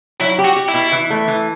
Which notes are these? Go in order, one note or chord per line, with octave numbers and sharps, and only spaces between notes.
F#3 E4
G4
F#4
G4
E4
B2
E3
A3
E3